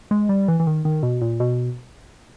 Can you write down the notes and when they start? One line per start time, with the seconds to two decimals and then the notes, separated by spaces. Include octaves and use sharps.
0.11 G#3
0.29 G3
0.48 E3
0.60 E3
0.67 D#3
0.85 D#3
1.03 B2
1.22 A#2
1.40 B2